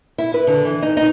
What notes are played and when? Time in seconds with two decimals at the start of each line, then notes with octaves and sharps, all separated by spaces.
0.18 E4
0.34 B4
0.47 D3
0.65 E3
0.82 D#4
0.97 D#4